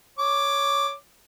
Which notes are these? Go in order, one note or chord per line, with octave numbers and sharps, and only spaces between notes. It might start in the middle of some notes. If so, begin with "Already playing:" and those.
C#5 D6